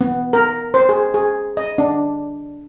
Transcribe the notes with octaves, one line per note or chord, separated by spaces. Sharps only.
B3
A#4
C5
G#4
G#4
D#5
D4